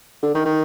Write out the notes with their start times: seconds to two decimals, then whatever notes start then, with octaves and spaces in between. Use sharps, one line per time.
0.23 D3
0.35 D#3
0.45 D#3